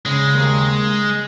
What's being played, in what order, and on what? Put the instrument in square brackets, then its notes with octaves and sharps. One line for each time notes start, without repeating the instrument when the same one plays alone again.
[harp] C#3 [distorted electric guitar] G#3
[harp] D#2